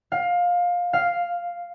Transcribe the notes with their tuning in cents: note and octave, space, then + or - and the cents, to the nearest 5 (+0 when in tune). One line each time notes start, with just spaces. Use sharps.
F5 +20
F5 +0